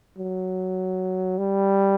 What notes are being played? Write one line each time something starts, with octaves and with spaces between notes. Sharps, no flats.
F#3
G3